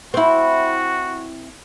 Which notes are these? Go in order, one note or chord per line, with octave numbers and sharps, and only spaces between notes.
C4 E4 F#4